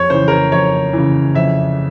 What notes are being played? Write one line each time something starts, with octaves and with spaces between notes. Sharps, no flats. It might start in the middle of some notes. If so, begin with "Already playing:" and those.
Already playing: F2 C#5
C#3 E3 C5
A#4
C5
F2 C#5
C#3 E3
F2 E5